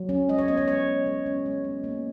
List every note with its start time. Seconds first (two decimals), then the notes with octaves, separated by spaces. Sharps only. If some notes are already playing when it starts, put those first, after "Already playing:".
Already playing: F#3
0.09 C#4
0.29 G#3 D#5
0.39 C#5
0.48 B3 D#5
0.57 C#5
0.68 G#3 C#5
0.87 B3
1.07 G#3
1.26 C#4
1.46 G#3
1.64 B3
1.84 A#3